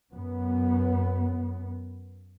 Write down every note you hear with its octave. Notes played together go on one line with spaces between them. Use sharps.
F#2 B3